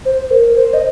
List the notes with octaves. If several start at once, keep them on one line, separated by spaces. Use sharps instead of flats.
C5
A#4
C5
D#5